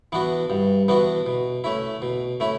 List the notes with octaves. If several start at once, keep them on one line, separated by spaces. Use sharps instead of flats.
E3 B3 D4 F#4
G2
E3 B3 D4 F#4
B2
A3 C#4 E4
B2
A3 C#4 E4